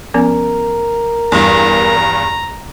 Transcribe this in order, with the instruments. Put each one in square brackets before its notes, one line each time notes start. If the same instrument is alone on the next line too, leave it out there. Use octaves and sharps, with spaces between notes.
[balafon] F3 B3 C#4 [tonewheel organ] A#4
[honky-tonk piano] E2 G2 [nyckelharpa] A#5 [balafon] C6